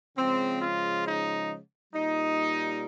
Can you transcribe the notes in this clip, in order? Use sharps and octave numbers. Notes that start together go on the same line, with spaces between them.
C#3 F3 G#3 C4
F4
D#4
A#2 G3 D#4